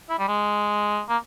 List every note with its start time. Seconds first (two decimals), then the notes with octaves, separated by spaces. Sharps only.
0.09 E4
0.19 G3
0.28 G#3
1.09 A#3